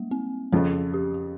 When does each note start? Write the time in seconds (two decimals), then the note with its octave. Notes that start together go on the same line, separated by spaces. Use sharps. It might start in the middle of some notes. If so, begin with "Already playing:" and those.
Already playing: G3 G#3 A#3
0.11 C4
0.52 F2 C#3 F3 C#4
0.94 G4